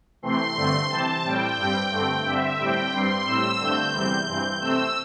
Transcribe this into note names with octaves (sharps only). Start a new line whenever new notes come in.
C3 E3 A3 C4 C6
G2 D3 A3 C4
C3 E3 C4 A5
A2 G3 C4 G5
G2 G3 C4
G2 D3 A3 C4
G2 D3 C4 E5
A2 G3 C4 G5
G2 G3 C4 C6
A2 G3 C4 E6
G2 D3 A3 C4 G6
E2 C3 G3 C4
G2 E3 C4
C3 A3 C4 E6